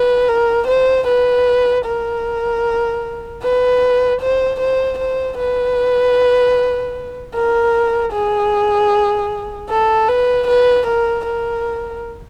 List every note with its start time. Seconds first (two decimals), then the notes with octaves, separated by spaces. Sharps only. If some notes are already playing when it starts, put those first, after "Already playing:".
Already playing: B4
0.28 A#4
0.68 C5
1.07 B4
1.85 A#4
3.43 B4
4.21 C5
4.60 C5
4.98 C5
5.38 B4
7.35 A#4
8.13 G#4
9.69 A4
10.08 B4
10.48 B4
10.87 A#4
11.26 A#4